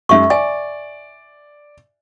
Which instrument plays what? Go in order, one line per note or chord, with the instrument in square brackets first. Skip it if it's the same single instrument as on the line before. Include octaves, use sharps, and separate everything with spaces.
[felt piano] F#2 G#3 [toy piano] E5 C#6
[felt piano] D5 [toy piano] G#5